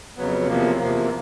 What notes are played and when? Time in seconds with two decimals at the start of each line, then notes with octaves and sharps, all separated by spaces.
0.17 F2 C#3 F#3 B3
0.47 E2 C3 F3 A#3
0.79 E2 C3 F3 A#3